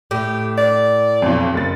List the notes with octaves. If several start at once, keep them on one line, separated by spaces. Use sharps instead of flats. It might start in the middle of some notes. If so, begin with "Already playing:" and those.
A2 G4
D5
B1 F2
F#1 A6